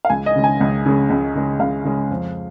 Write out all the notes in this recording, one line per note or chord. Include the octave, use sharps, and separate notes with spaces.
F5
C#2 G#5
D#5
C#3 G#3
G#5
C#2
C#3 G#3
C#2
C#3 G#3
C#2 F5
C#3 G#3
F2